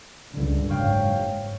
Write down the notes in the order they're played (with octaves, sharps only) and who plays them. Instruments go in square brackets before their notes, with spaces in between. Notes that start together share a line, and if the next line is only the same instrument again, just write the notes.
[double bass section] C#2 G2 D3
[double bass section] F#1 G#2 [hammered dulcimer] C#5 F5 G5